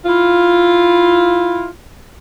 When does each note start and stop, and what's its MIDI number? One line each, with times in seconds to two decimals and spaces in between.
0.05 1.68 64
0.05 1.68 65